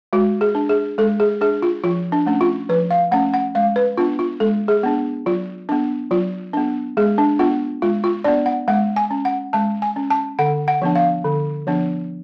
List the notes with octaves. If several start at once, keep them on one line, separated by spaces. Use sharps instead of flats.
G#3 F#4
G#4
D4
G#4
G#3 A4
G#4
D4 G#4
F4
F3 F4
D4
A3 C#4
F4
F3 B4
F5
A3 C#4 F#5
F#5
G#3 F5
B4
B3 D4 F4
F4
G#3 A4
G#4
B3 D4
F#3 F4
B3 D4
F#3 F4
B3 D4
G#3 G#4
D4
B3 D4 F4
G#3 F4
F4
B3 D4 D5
F#5
G#3 F#5
G#5
C#4
F#5
G#3 A5
G#5
C#4
A5
D3 F#5
F#5
F3 B3 D4
F5
D3
F3 B3 D4